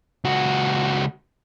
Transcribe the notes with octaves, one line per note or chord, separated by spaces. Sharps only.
C#2 F#4